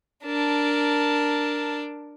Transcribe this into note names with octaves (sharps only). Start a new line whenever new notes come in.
D4 A#4 A5